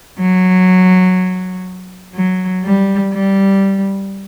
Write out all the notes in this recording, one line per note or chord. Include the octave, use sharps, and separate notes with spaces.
F#3
F#3
G3
G3